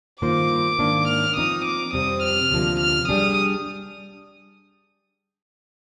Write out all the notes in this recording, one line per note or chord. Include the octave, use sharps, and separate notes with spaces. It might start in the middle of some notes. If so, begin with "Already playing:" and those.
G2 D#3 A#3 F4 C5 D6
G#2 D#3 A#3 D4
F6
F3 C4 D#4 D#6
D6
F2 C3 G3 C4 D#6
F6
D2 C3 F3 A#3 D4
F6
G3 D4 G#4 D#6